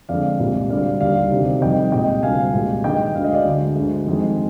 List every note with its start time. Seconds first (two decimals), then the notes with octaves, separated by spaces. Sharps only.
0.09 F2 D3 G#3 D5 F5
0.40 C2 A#2 G#3
0.70 D2 D3 G3 D5 F5
1.00 D#2 D3 G3 D5 F5
1.31 D2 C3 D#3
1.61 F2 D#3 G3 D#5 G5
1.92 C2 A#2 G#3 D#5 G5
2.23 D2 C3 G3 F5 G#5
2.53 C2 A#2 G#3
2.84 G2 D#3 G#3 D#5 G5
3.15 D2 D3 G#3 F5
3.24 D#5
3.33 D5 F5
3.45 D2 D3 G#3
3.75 D2 D3 G#3
4.06 F2 D#3 G#3